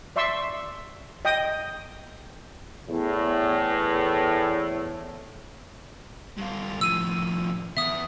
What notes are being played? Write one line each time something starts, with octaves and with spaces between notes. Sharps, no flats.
D5 E5 C6 C#6 E6
D#5 G5 D#6
E2 A2
G2 F4
A2 F3 E6 D#7
E2 E5 D#6